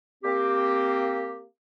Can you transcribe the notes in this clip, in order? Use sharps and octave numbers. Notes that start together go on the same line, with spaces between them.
A#3 C4 G4